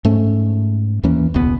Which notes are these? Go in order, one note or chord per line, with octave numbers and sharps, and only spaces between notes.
G#2 A3 C#4
D#2 E3 A#3 C#4
E1 C#2 B3